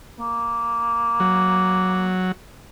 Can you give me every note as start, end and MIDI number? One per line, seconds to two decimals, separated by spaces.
0.20 2.16 58
1.20 2.32 54